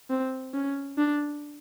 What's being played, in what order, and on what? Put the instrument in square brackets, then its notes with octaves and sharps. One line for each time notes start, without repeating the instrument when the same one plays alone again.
[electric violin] C4
C#4
D4